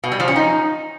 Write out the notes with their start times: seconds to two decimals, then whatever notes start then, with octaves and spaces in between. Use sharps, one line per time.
0.04 B2
0.12 G3
0.20 F3
0.28 C#4
0.36 D#4